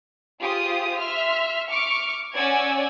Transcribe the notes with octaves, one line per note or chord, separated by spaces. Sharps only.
F4 G4 G#4 C5 D#6
E5 C6 F6
C#6 D6 F6 C#7 D7
C#4 D5 F#5 G#5 E6 G#6